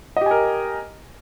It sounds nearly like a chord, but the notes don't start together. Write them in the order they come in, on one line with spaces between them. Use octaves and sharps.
D#5 G4 G#5 A#4